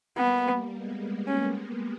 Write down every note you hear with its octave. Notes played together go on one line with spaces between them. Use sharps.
G3 A#3 B3
G#3 B3
C#4